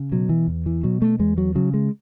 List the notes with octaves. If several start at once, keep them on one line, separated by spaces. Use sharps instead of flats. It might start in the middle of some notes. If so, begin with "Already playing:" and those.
Already playing: C#3
B2 F#3
E3
E2
E3
B2 F#3
A3
E2 G#3
F#3
C#3 F#3
G#3